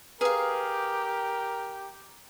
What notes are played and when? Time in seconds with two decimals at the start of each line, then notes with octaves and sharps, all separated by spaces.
0.21 G4 G#4 A#4 B4 F5